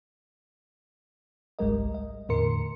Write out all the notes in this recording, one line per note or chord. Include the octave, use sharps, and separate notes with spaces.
G#1 C#2 G3 G#3 A#4 D#5
D#5
E2 A2 D3 A#4 C6 C#7